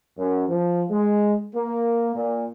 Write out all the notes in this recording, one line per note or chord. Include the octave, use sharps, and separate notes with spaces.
F#2
F3
G#3
A#3
A#2